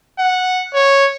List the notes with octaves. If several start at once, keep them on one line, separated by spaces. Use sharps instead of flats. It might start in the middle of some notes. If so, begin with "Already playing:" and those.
F#5
C#5